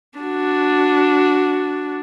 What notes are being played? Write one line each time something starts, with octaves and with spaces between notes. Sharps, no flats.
D4 F#4